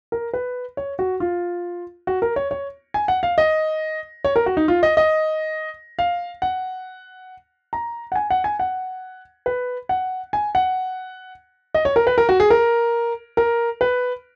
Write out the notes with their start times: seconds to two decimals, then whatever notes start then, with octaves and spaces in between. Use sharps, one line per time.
0.12 A#4
0.33 B4
0.77 C#5
0.99 F#4
1.20 F4
2.07 F#4
2.22 A#4
2.36 C#5
2.51 C#5
2.94 G#5
3.08 F#5
3.23 F5
3.38 D#5
4.24 C#5
4.36 A#4
4.46 F#4
4.57 D#4
4.68 F4
4.83 D#5
4.97 D#5
5.99 F5
6.42 F#5
7.73 A#5
8.12 F#5
8.16 G#5
8.30 F#5
8.44 G#5
8.59 F#5
9.46 B4
9.89 F#5
10.33 G#5
10.55 F#5
11.74 D#5
11.85 C#5
11.96 A#4
12.07 B4
12.18 A#4
12.29 F#4
12.40 G#4
12.50 A#4
13.37 A#4
13.81 B4